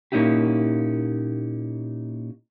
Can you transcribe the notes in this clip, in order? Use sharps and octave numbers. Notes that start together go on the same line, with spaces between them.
A#2 A#3 C#4 D#4 E4 G4